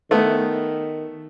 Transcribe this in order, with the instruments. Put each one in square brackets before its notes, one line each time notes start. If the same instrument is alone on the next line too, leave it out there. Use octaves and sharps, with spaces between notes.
[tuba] D#3 [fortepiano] A3 B3